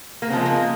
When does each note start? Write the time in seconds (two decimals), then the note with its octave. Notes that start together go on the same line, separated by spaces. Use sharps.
0.22 A#3
0.30 C#3 F3 G#3 C4
0.46 A#3